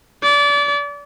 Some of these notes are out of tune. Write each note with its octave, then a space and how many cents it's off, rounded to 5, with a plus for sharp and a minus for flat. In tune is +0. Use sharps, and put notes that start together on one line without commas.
D5 -30